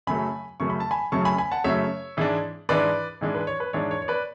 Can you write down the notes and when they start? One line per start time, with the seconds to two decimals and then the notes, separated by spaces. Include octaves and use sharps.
0.07 F#2 C#3 F#3 A3 G#5 B5
0.60 F#2 C#3 F#3 A3 C#6
0.70 B5
0.80 A5
0.91 G#5 B5
1.12 F#2 C#3 F#3 A3 A5 C#6
1.25 G#5 B5
1.38 G#5 B5
1.51 F#5 A5
1.64 F#2 C#3 F#3 A3 C#5 E5
2.17 G#2 E3 G#3 D4
2.69 G#2 E3 G#3 D4 B4 D5
3.21 G#2 E3 G#3 D4
3.34 B4
3.47 C#5
3.60 B4
3.73 G#2 E3 G#3 D4 C#5
3.91 C#5
4.02 C#5
4.08 B4 D5